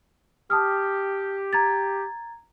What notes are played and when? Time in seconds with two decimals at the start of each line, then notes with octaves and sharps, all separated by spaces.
0.50 G4 A5 D#6 F6
1.53 A#5 G#6 A6